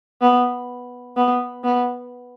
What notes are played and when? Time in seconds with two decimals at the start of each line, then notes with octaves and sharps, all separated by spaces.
0.22 B3
1.16 B3
1.64 B3